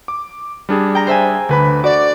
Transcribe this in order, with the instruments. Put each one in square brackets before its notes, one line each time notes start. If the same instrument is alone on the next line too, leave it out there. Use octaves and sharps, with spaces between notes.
[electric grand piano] D6
G3 D4 G#4
[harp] G5 A#5
C5 E5 G#5
[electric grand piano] D2 B4 B5 [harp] D3
[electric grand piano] F#4 [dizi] D5 [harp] D6